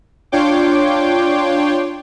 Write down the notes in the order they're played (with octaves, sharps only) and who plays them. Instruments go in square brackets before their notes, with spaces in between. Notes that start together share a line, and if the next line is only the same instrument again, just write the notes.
[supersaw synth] D4 F4 C#5 G5 C6 D6